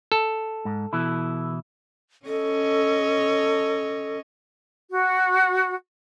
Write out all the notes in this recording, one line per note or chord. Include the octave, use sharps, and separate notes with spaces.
A4
G#2
B2 E3 E4
C#4 A4 C#5 D#5
F#4